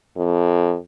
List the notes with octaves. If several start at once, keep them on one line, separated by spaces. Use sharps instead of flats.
F2